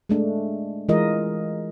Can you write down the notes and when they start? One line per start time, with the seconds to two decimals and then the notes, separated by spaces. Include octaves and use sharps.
0.09 G#3 A3 D4
0.89 E3 G#3 F4 A#4 D#5